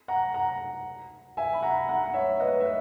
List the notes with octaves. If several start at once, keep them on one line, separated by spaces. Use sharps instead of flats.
F#5 A#5
F#5 A#5
E5 G#5
B5
F#5 A#5
F#5 A#5
F#5
C#5 E5
B4 D#5
E5
B4